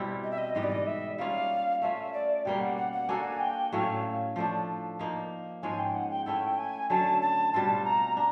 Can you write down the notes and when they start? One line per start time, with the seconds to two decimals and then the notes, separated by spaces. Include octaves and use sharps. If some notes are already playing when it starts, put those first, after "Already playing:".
Already playing: B2 G3 C4 E4
0.23 D#5
0.31 E5
0.38 D#5
0.55 G#2 E3 G3 B3 D#5
0.63 D5
0.72 D#5
0.87 E5
1.18 G3 A#3 C#4 F4 F5
1.82 A3 C#4 F4 E5
2.13 D5
2.45 B2 G3 A#3 C#4 G5
2.61 F#5
2.77 F#5
2.93 F#5
3.09 A#3 D4 F#4 A4 G#5
3.40 G5
3.72 A2 F#3 A3 C#4 F5
4.36 F3 A3 D4
4.99 F3 A#3 D#4
5.63 G#2 F3 G#3 C#4 G#5
5.79 G5
5.95 F#5
6.11 G5
6.26 A3 C#4 E4 A4 G5
6.58 G#5
6.90 D3 F#3 A3 C#4 A5
7.22 A5
7.53 B2 G3 C4 F4 A5
7.85 A#5
8.17 D4 A#5